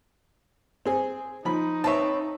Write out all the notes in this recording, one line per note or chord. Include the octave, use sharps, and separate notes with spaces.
C4 G#4
F3 D#4 B5
C4 B4 C#5 E5 A5